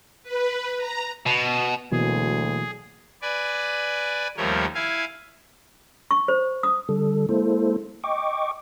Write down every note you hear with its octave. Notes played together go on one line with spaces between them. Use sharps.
B4
A#5
B2
D2 B2 E3 F#3 A#3 G#4
B4 D5 G#5
D#2 F3 G3 A3 A#4 C#5
E4 F5 G#5
C#6
C5
D#6
D3 G3 A4
G#3 A#3 E4 A4 C5
D#5 G5 C#6 D6